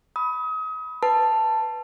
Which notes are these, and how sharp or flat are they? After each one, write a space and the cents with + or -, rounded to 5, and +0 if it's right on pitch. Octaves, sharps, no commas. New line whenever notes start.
B5 +0 D#6 +35
B4 +0 A5 +0